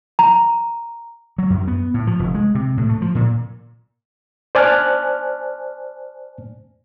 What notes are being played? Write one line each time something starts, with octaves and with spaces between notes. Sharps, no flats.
A#5
F#3
F#2
B3
A2
F3
F1
G#3
C3
A2
A3
F3
A#2
C5 D5 G#5 A5 F6 F#6